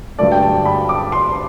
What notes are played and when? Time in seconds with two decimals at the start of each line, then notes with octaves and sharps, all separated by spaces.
0.19 G2 D3 F#3 A3 D5
0.32 G5
0.43 A5
0.65 B5
0.89 D6
1.12 C6